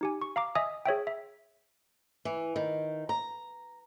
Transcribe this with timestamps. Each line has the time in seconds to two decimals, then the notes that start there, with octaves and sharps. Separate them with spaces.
0.01 D#4 G4 G#5
0.22 C#6
0.36 F5 A#5 D6
0.55 D#5 E5 G#5 D#6
0.86 G#4 C#5 E5 G5
1.07 E5
2.25 E3
2.56 D#3
3.09 A#5